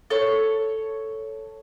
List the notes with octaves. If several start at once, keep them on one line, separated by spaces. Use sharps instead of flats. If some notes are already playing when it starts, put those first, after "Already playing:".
A4 C#5